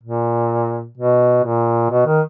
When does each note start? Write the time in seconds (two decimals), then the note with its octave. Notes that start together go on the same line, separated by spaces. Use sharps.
0.04 A#2
0.98 B2
1.44 A#2
1.91 B2
2.07 D#3